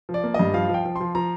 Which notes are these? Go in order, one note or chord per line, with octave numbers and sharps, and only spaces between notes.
F3
D5
A#3
G2 D#5
F3 F5
F3 G5
F3
C6
F3
F3 A#5